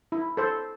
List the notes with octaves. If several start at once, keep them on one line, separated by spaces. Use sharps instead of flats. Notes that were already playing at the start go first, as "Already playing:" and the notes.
E4
A4 C5